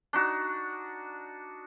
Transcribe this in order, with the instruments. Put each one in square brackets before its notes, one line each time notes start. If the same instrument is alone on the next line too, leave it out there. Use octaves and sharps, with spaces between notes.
[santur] D4 D#4 F#4